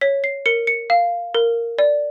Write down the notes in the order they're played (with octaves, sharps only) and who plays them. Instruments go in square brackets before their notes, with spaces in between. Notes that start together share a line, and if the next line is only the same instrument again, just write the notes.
[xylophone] C#5 B6
C7
A#4 C#7
C#7
F5
A#4
D5